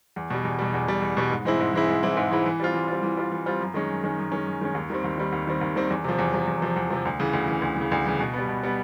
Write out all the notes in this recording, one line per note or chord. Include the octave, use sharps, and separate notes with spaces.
E2
B2 G3
E2
B2 G3
E2
B2 G3
E2
B2 G3
G#2
E3 G#3 C4 E4
G#2
E3 G#3 C4 E4
G#2
E3 G#3 C4 E4
G#2
E3 G#3 C4 E4
E3
G3 C4 F4
E3
G3 C4 F4
E3
G3 C4 F4
E3
G3 C4 F4
F#2
D#3 G#3 C#4
F#2
D#3 G#3 C#4
F#2
D#3 G#3 C#4
F#2
D#3 G#3 C#4
D#2
D#3 G3 C4
D#2
D#3 G3 C4
D#2
D#3 G3 C4
D#2
D#3 G3 C4
E2
C3 F3
E2
C3 F3
E2
C3 F3
E2
C3 F3
D2
C#3 E3
D2
C#3 E3
D2
C#3 E3
D2
C#3 E3
B2
G3 B3
B2
G3 B3